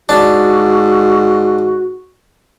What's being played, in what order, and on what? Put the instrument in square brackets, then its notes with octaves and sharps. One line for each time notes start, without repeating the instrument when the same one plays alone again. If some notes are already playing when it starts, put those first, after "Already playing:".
[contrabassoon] G#2 [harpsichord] D4 [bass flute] F#4